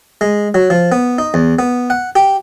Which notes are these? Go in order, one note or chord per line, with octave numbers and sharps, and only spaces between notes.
G#3
F#3
F3
B3
D#4
E2
B3
F#5
G4